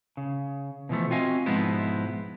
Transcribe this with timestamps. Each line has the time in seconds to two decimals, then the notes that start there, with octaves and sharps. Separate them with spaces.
0.17 C#3
0.89 B2 E3 F3 A3
1.11 C4 F4 F#4 D#5 F5 G#5
1.46 G#2 B2 F3 G#3 B3 E4